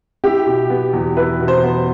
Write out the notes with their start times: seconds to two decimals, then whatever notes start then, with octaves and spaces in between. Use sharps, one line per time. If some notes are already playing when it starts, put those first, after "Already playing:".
0.24 E4 G4
0.47 B2
0.70 B3
0.93 E2
1.17 E4 B4
1.40 B2
1.48 C5
1.64 B3